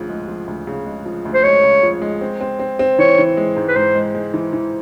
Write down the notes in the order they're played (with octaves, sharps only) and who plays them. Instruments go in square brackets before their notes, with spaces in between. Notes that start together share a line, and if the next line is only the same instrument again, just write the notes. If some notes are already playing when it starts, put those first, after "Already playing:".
Already playing: [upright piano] D2 C#3 F3
G#3
F3
D2
C#3
G#3
F3
D2
[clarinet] C5
[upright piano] G#3 [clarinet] C#5
[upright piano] C#3
F3
G#3
C4
C4
C4
C4
[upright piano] E3 [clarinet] C#5
[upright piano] E3
G#3
G#2
[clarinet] B4
[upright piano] G#2 [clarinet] C5
[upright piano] G#3
G#3
E3
E3